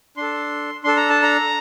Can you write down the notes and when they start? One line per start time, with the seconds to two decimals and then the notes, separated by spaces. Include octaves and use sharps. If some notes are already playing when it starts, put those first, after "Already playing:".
0.17 D4 A4 C6
0.84 D4 A4 C6
0.96 A#5
1.10 A5
1.22 A#5